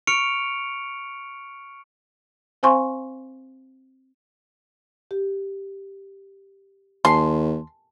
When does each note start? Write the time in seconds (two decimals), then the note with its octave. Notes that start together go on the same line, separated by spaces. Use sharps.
0.07 C#6 F6 C#7 D7 F7
2.63 C4 C5 F5 G#5 C6 C#6
5.11 G4
7.05 D#2 G#5 A5 C6